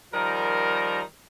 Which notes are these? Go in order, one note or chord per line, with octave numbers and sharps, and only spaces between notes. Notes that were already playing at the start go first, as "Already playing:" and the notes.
D#3 F3 G3 A#4